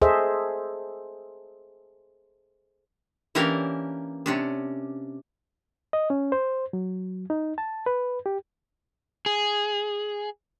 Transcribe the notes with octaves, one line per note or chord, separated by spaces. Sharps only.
G#4 A4 C5 D#5 E5
E3 A#3 C#4 D4 G4 A#4
C3 C#4 D4
D#5
C#4
C5
F#3
D#4
A5
B4
G4
G#4